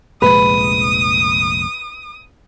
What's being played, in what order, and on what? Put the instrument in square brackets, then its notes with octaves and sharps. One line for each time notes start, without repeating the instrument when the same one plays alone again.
[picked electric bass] F1 A#1 G#3 [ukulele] B4 [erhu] D#6